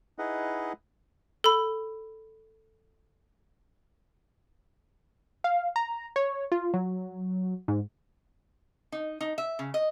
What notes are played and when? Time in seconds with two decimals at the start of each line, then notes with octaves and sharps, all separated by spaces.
0.18 D#4 E4 G#4 B4 D#5 F#5
1.44 A4 B5
5.44 F5
5.76 A#5
6.16 C#5
6.52 F4
6.74 F#3
7.68 G#2
8.92 D#4
9.21 D#4
9.38 E5
9.59 C#3
9.74 D#5